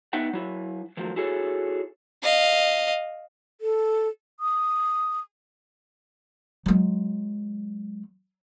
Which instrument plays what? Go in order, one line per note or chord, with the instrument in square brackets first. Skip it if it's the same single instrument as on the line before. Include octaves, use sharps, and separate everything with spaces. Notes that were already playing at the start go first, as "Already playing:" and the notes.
[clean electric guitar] B3 D#4 B4 E5 F#5 G5
F#3 E4
D#3 F3 F#3 A3
E4 F#4 G#4 A4 C#5
[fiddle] D#5 F5
[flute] A4
D#6
[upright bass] F#3 G#3